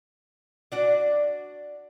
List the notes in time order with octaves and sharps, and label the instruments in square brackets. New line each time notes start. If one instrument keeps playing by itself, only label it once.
[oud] D4 F#4 D5